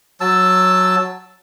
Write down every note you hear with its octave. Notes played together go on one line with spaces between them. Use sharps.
F#3 A5 E6